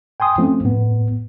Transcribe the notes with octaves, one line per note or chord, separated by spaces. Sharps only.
G5 G#5 C6 D#6
F3 A3 C4 C#4
A2 B3